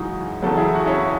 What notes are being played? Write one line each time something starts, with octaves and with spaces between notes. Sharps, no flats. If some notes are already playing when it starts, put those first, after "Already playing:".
Already playing: F#2 C#3 E3 G#3 D#4 F#4
E2 C#3 F#3 A4
E4 G#4
F#4
C#4 E4